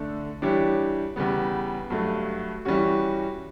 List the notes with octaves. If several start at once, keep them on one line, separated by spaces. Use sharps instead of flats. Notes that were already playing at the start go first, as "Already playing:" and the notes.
Already playing: D3 A3 D4 A4
E3 G3 D4 G4 C#5
E2 C#3 G3 B3
G2 F#3 A3
E3 G3 C#4 F#4